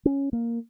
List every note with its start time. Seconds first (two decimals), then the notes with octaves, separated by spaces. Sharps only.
0.05 C#4
0.33 A#3